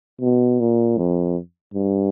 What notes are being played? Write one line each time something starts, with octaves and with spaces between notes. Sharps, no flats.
B2
A#2
F2
G2